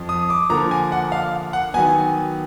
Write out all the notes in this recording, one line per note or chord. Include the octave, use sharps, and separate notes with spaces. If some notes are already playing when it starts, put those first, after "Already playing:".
Already playing: F2 F3
D#6
D6
D3 F3 A#3 A#5
G#5
F#5
F5
F#5
D#3 F#3 B3 G#5